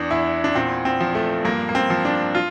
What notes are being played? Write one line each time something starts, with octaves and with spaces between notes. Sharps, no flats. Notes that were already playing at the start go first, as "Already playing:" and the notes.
Already playing: E2 D4
E2 E4
D4
A#2 C4
C4
F3
A3
G2 A#3
A#3
C4
F3
D4
F4